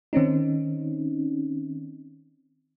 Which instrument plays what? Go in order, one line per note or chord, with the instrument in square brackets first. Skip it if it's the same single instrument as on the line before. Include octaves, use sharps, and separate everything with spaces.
[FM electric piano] D#3 C4 C#4 D#4